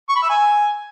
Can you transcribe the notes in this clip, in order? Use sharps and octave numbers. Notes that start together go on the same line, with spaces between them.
C#6
B5
E5
G#5